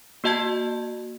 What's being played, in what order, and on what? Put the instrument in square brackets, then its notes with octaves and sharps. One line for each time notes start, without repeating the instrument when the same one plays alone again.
[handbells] A#3 F#4 D#5 A5 G#6